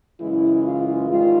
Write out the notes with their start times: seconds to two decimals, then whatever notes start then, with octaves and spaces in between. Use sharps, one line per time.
0.20 F#2 C#3 E3 G#3 E4
0.64 F4
1.08 G#2 D#3 G3 F4